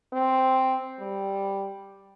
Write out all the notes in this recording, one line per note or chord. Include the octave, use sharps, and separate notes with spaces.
C4
G3